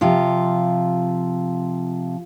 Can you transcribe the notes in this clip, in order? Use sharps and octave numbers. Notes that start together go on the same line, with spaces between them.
C3 F3 F4